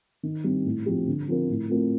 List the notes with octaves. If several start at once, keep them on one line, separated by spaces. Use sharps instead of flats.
D#3
G3 C4
A2
F3 C4 G4
D3
F3 C4 F4 A#4
A2
A3 C4 F4 A#4